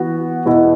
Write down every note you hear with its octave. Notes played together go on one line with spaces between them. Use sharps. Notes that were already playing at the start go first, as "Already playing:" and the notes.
Already playing: E3 B3 F#4
E2 B2 B3 E4